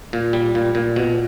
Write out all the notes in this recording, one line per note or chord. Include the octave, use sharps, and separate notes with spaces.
A#2
G3
A#2
A#2
B2